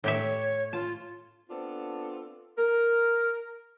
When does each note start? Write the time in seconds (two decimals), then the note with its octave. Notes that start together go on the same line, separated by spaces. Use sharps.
0.04 A2 G4 C#5 E5
0.73 F4 A5
1.50 B3 C4 D4 F4 A4
2.58 A#4